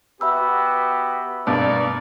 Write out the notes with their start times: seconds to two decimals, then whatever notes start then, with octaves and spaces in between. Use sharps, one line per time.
0.21 B3 F#4 G4 E5 B5 E6
1.47 G2 B2 A#3 D#4 D5